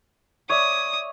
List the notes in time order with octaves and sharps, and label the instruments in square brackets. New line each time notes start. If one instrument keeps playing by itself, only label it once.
[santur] C#5 D5 E5 [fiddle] D#6